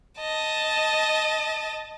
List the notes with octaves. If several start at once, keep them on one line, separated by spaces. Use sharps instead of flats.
D#5 A5